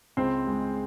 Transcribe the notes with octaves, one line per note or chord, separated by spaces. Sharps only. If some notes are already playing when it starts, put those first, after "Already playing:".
C#2 C4 C5
G#3